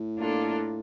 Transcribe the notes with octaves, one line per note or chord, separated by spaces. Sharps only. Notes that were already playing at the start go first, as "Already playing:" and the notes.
Already playing: A2
A#3 D4 F4 A4